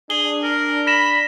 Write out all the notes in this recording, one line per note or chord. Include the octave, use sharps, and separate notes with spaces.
D4 G#4 G7
A#4
B5 A#6 E7